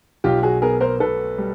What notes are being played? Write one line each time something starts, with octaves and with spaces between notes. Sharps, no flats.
B1 F4 G4
F#4 G#4
B3 G#4 A#4
A#4 C5
B2 A4 B4
G3